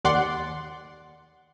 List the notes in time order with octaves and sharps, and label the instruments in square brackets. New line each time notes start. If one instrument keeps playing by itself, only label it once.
[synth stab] D#2 D5 F#5 C6